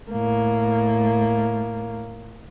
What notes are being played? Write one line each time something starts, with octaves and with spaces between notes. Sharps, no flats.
A2 A#3